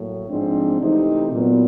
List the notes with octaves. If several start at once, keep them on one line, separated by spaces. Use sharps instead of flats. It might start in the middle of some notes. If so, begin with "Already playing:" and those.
Already playing: A2 F#3 A#3
G#2 F3 G#3 C4 D4
C3 E3 A3 C4 D#4
A#2 F#3 B3